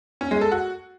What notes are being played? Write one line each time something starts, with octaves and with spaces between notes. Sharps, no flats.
C#4
G#3
A4
F#4